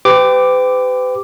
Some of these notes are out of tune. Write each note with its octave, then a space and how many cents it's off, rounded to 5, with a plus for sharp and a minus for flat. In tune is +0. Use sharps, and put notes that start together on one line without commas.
G4 +5 B4 +40 D6 +0